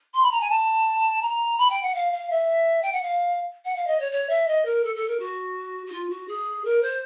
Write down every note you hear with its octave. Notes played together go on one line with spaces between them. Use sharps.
C6
B5
A#5
G#5
A5
A#5
B5
G5
F#5
F5
F5
E5
G5
F#5
F5
F#5
F5
D#5
C#5
C#5
E5
D#5
A#4
A4
A4
A#4
F#4
F#4
F4
F#4
G#4
A#4
C5